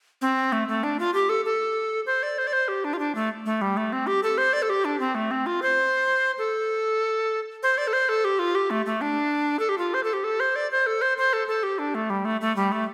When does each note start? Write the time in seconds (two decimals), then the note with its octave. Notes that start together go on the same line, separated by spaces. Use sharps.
0.21 C4
0.52 A3
0.68 A3
0.83 D4
0.99 F4
1.14 G4
1.29 A4
1.45 A4
2.06 C5
2.23 D5
2.38 C5
2.47 D5
2.53 C5
2.68 G4
2.84 D4
2.93 F4
2.99 D4
3.15 A3
3.46 A3
3.61 G3
3.77 A3
3.92 C4
4.07 G4
4.23 A4
4.38 C5
4.53 D5
4.62 A4
4.69 G4
4.85 D4
5.00 C4
5.15 A3
5.31 C4
5.46 F4
5.62 C5
6.38 A4
7.63 C5
7.78 D5
7.87 A4
7.93 C5
8.09 A4
8.24 G4
8.39 F4
8.55 G4
8.70 A3
8.86 A3
9.01 D4
9.59 A4
9.69 G4
9.78 F4
9.94 C5
10.03 A4
10.13 G4
10.24 A4
10.40 C5
10.56 D5
10.71 C5
10.86 A4
11.01 C5
11.18 C5
11.33 A4
11.48 A4
11.63 G4
11.79 D4
11.94 A3
12.10 G3
12.25 A3
12.41 A3
12.56 G3
12.72 A3